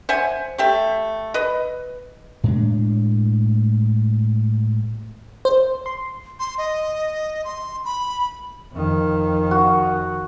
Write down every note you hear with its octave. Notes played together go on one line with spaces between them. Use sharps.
C5 E5 F#5 G#5
A3 G4 E5
B4 D#5
A2 G#3 D4
C5
C6
C6
D#5
C6
B5
F2 D#3
F#4